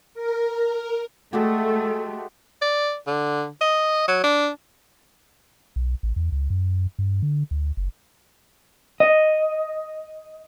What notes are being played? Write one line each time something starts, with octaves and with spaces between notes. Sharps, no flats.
A#4
G#3 A3 F#4 G4 A4
D5
D3
D#5
F#3
D4
B1
A1
E2
C#2
F#2
G2
D3
D2
F#1
D#5